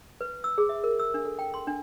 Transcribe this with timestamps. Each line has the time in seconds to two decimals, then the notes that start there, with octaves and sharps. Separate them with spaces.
0.21 B4
0.44 E6
0.58 G#4
0.69 E5
0.84 A#4
0.99 E6
1.14 D4
1.25 A4
1.39 G5
1.54 C6
1.67 D4